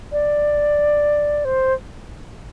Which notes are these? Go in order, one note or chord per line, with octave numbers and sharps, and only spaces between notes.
D5
C5